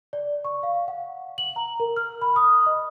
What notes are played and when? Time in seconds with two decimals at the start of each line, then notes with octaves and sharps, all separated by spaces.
0.13 D5
0.45 C#6
0.63 F5
0.88 F#5
1.38 F#7
1.56 A#5
1.80 A#4
1.97 F6
2.21 B5
2.36 D#6
2.66 D#5